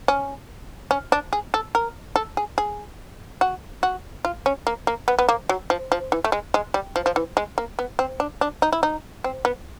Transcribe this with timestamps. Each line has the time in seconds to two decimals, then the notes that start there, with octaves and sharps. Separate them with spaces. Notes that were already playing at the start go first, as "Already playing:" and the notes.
0.08 C#4
0.91 C#4
1.12 D4
1.33 G#4
1.54 A4
1.75 A#4
2.16 A4
2.37 G#4
2.58 G#4
3.41 F#4
3.83 F#4
4.25 F4
4.46 C#4
4.67 A#3
4.87 A#3
5.08 B3
5.19 B3
5.29 A#3
5.49 F#3
5.70 F3
5.92 F3
6.12 E3
6.24 A3
6.32 G#3
6.54 G#3
6.74 G3
6.96 F3
7.06 F3
7.16 E3
7.37 G#3
7.58 A#3
7.79 B3
7.99 C4
8.20 D4
8.41 D4
8.62 D#4
8.72 E4
8.83 D#4
9.24 C4
9.45 B3